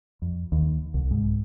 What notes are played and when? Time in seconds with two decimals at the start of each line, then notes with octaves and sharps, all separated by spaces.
0.22 F2
0.52 D#2
0.94 C2
1.11 G#2